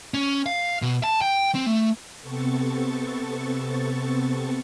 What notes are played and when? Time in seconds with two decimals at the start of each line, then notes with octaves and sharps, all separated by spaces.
0.14 C#4
0.46 F5
0.82 B2
1.04 A5
1.21 G5
1.55 C4
1.66 A3
2.19 C3 B3 C4 A4 C#6 A6